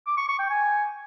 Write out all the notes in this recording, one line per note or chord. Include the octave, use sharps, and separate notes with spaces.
D6
C#6
C#6
G5
G#5